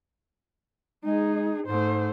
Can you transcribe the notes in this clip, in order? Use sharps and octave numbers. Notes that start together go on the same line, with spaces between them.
G#3 D#4 G#4
G#2 A3 C5